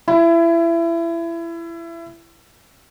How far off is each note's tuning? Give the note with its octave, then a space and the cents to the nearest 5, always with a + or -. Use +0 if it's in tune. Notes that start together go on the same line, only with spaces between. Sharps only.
E4 +25